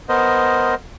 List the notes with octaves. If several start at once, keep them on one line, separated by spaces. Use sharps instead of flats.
B3 A#4 C5 D#5